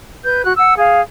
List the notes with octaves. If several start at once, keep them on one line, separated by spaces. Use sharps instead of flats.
B4 G6
F#4 F#6
F#5 E6
G#4 F5